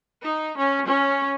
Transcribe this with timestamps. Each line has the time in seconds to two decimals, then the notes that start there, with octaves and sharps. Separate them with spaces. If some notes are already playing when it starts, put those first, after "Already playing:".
0.23 D#4
0.58 C#4
0.86 C#4